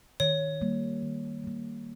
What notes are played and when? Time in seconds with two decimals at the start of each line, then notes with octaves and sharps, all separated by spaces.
0.20 D#3 C#5
0.61 G3 A#3
1.02 D#3
1.44 G3 A#3